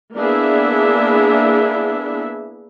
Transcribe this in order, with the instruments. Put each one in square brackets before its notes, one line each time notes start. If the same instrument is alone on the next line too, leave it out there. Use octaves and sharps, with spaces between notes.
[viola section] A#3 B3 D4 E4 G#4 E5